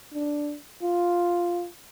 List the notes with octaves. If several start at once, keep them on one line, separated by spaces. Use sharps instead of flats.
D4
F4